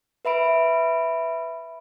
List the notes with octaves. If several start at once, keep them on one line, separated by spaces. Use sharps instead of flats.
B4 E5 B5 D7